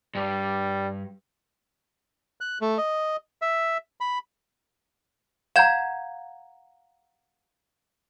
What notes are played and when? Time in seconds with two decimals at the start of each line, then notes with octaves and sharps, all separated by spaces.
0.15 G2 G3
2.41 F#6
2.61 A3
2.78 D#5
3.42 E5
4.01 B5
5.56 F5 F#5 A#5 G6 G#6 E7